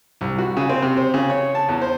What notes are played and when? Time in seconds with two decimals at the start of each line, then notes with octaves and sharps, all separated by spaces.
0.21 C2
0.38 F#4
0.57 C#3
0.70 C4
0.82 C3
0.97 C5
1.14 C#3
1.30 C#5
1.55 A5
1.69 E2
1.82 C5